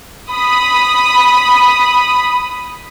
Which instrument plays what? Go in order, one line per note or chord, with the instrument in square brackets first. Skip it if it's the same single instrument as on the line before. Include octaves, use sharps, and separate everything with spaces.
[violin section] B5 D#6